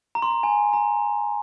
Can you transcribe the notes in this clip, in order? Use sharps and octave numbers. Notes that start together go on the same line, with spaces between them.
A#5
C6
A#5
G#5
A#5